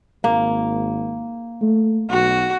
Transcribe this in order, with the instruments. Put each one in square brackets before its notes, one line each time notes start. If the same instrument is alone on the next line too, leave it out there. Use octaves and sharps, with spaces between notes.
[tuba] G#1 [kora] A#3
[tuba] A3
[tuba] B1 [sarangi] F#4